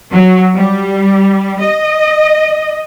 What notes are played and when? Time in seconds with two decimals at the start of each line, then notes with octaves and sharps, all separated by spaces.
0.11 F#3
0.55 G3
1.60 D#5